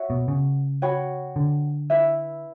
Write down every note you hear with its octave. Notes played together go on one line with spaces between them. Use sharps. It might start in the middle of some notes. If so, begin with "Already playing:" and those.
Already playing: F#4 C#5 E5
B2
C#3
F#4 C#5 G5 B5
D3
E4 B4 E5